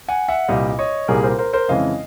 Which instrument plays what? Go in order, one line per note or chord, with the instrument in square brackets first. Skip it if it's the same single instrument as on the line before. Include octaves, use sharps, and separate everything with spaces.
[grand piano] F#5 G#5
E5 F#5
C2 A#2 G3 D#5 F5
C#5 D#5
C2 A#2 G3 G#4 A#4
A#4 C5
A#4 C5
A#4 C5
F2 C#3 E3 G#3 D#5 F5